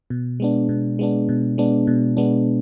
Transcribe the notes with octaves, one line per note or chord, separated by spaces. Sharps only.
B2
G#3 B3 D4
B2
G#3 B3 D4
B2
G#3 B3 D4
B2
G#3 B3 D4